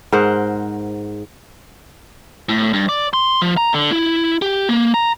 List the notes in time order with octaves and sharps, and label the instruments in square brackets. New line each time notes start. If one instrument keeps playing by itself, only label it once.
[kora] G#2 A#4 C5 F#5
[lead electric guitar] A2
G2
D5
C6
F3
A#5
D3
E4
G4
A#3
A#5